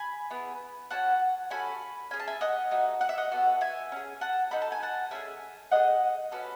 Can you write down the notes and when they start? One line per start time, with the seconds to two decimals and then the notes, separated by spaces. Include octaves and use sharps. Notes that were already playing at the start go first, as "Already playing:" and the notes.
Already playing: G#5 B5
0.30 B3 E4 G#4
0.91 C#4 F#4 A4 F#5 A5
1.50 C#4 F#4 A4 G#5 B5
2.11 C#4 G#4 G#5
2.20 A5
2.28 E5 G#5
2.41 D#5 F#5
2.71 A3 D#4 F#4
3.01 F#5
3.09 E5
3.18 D#5 F#5
3.32 B3 F#4 A4
3.61 E5 G#5
3.92 C#4 G#4
4.21 F#5 A5
4.51 D#4 F#4 A4 B5
4.62 A5
4.72 G#5
4.83 F#5 A5
5.11 A3 C#4 G#4 E5 G#5
5.72 A3 D#4 D#5 F#5
5.75 G#4
6.32 C#4 F#4 A4 B4